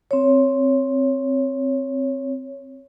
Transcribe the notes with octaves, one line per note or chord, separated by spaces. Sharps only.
C4 C#5